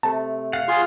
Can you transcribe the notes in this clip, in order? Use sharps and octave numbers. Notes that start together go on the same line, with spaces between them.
C3 A3 A5
F5 F#5 A6
F4 G#4 C6 C#6